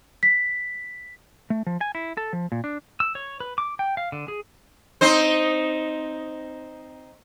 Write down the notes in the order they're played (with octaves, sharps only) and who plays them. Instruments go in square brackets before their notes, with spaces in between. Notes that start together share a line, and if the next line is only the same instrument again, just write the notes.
[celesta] B6
[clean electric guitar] A3
F3
G#5
E4
A4
F3
A#2
D4
[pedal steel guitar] E6
C#5
B4
D6
G5
F5
D3
G#4
[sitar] C4 D#4 C5